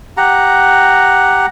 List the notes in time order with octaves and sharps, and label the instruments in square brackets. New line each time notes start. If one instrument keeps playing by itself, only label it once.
[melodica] G4 F#5 A#5